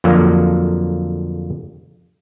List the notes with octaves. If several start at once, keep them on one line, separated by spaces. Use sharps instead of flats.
F2 D3 F#3 A#3